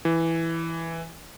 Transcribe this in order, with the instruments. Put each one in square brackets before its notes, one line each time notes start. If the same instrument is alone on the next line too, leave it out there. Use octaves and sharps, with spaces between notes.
[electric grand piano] E3